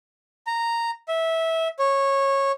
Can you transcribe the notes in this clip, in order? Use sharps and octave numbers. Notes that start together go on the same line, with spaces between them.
A#5
E5
C#5